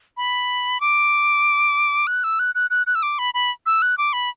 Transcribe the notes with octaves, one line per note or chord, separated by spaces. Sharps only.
B5
D6
F#6
E6
F#6
F#6
F#6
F#6
E6
D6
B5
B5
E6
F#6
D6
B5